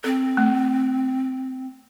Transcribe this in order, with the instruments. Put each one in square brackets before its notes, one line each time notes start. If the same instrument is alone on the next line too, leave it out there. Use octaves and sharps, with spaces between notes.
[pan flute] C4 [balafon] A4
[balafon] A3